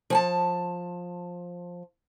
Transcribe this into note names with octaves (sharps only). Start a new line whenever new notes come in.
F3 G#5 A5